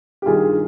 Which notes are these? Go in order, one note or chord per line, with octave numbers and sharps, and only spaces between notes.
G4
G2 D#3 F4 G#4